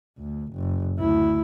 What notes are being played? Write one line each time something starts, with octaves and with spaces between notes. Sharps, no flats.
D2
F#1
D2 E4